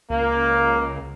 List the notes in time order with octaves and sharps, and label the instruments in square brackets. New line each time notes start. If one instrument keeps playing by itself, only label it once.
[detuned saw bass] C#2 [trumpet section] A#3